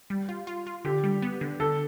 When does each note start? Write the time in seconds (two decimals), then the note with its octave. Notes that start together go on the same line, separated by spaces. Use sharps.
0.10 G3
0.29 F4
0.47 F4
0.67 F4
0.85 D3 G4
1.04 G3
1.22 B3
1.41 D3
1.60 D3 A4